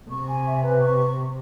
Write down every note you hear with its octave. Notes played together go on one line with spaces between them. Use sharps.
C3 C#6
G#5
E5
B4
C#6